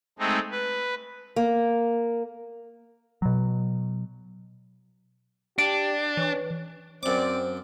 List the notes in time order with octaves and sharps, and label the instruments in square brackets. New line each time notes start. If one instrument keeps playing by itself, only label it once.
[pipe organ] G#3 A3 C4 D#4
B4
[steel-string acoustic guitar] A#3
[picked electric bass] B2 F#3
[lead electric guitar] D4 [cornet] G4 [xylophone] D7
[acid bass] E3 [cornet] C#5
[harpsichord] F#2 D6 [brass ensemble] C4 D5 [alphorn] C5